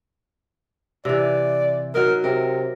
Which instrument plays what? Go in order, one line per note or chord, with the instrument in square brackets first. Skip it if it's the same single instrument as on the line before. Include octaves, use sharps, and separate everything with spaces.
[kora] C3 E3 [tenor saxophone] D5
[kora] F#3 D#4 [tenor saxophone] A#4
[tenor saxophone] C3 [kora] A#4